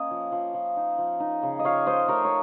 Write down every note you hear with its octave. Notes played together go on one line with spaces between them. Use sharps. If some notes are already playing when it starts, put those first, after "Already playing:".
Already playing: A#3 C#4 D#5
F3
F3
F3
D#4
F3
D#4
C#3
D#5
F3 C#5 F5
D#4 C5 D#5
A3 A#4 C#5
C#5